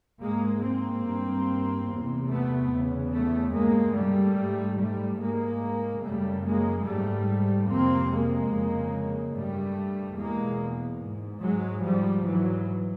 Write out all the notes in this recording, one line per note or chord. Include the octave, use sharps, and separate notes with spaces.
G#2 G#3 A#3
A#3 C4
G2
E2 C3
A3 B3
E2 C#3
A3 B3
G2 G#3 A#3
G3 A3
G#2
G3 A3
G#2 G#3 A#3
F#2 C#3 G3 A3
G#3 A#3
G#2 G3 A3
F2 C3 A#3 C4
G#3 A#3
F2 C#3
G2 G3 A3
E2 B2 G#3 A#3
G#2
F#3 G#3
G#2 F3 G3
E3 F#3